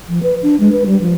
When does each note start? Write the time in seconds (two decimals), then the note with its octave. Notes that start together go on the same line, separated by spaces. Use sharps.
0.09 F3
0.23 B4
0.43 D4
0.60 G#3
0.72 B4
0.86 G3
1.01 F3